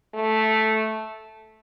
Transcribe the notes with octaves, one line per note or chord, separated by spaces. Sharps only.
A3